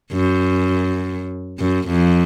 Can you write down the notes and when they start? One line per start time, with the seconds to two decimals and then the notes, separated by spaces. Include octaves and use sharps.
0.12 F#2
1.60 F#2
1.88 F2